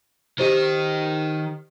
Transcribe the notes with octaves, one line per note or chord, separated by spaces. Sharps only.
D#3 G4 C5 D#5